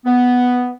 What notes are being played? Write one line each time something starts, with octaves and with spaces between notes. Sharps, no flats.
B3